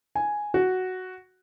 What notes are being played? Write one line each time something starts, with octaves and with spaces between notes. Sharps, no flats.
G#5
F#4